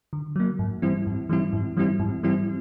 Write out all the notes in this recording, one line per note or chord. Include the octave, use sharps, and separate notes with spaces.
D3
F#3 A#3
G#2
E3 G3 C4 E4
G#2
E3 G3 C4 E4
G#2
E3 G3 C4 E4
G#2
E3 G3 C4 E4